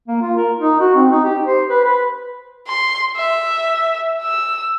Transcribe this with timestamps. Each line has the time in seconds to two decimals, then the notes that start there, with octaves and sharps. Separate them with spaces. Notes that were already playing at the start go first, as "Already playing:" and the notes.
0.08 A#3
0.22 F4
0.36 A#4
0.58 D#4
0.80 F#4
0.95 C4
1.11 D#4
1.24 G4
1.46 C5
1.68 B4
1.84 B4
2.68 C6
3.16 E5
4.22 E6